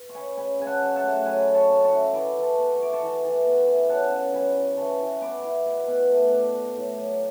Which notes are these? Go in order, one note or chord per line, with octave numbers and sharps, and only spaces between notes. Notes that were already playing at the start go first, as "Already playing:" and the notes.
Already playing: B4
C#6
C#4 G#5 B5
C#3 G#5 B5
C#3 G#5
F#5 A5
F#3
F#5 A5
A3
F#3 G#5 B5
F#3
A5 C#6
C#4
A5 C#6
E4
E3 B5 D6
E3
A5 C#6
B3
C#6
E4 D6
A5 C#6
E3
E3
B3
E4
C#3 F#5 A5
C#3
F#3 G#5 B5
C#4
E3 A5 C#6
E3
B3 B5 D6
E4
B2
B2
A3
D4
D4
A2
F#3